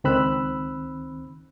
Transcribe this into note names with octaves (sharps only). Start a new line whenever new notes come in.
C#2 D#3 C4 B5 E6 F#6